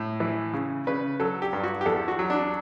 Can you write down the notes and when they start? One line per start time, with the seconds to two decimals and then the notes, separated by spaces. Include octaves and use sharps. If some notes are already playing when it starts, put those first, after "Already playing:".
Already playing: A2
0.20 E3
0.54 C#3
0.87 C#3 B4
1.20 F#3 A4
1.42 G4
1.53 G2
1.63 F#4
1.81 G4
1.86 E2 A4
2.08 F#4
2.19 F#3
2.30 D4